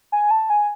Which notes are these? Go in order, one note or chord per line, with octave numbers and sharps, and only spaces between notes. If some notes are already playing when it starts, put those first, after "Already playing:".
G#5
A5
G#5